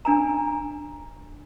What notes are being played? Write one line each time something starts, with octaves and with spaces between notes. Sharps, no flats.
D4 G#5 A#5